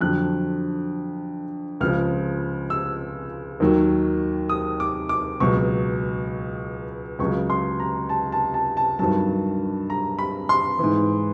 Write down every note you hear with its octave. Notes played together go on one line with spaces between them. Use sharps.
F2 D3 F#3 F#6
C#2 C#3 F3 F6
E6
D#2 D#3 F#3
D#6
D6
D6
C#2 B2 F#3 C#6
C#2 C#3 F#3 C#6
C6
A#5
A5
A5
A5
A5
G2 D#3 F#3 A5
A#5
B5
C6
G#2 E3